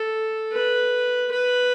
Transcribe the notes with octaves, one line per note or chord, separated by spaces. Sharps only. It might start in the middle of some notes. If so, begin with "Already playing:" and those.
Already playing: A4
B4
B4